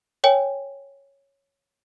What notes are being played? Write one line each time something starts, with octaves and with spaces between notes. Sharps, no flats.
A#4 C#5 G5 G#5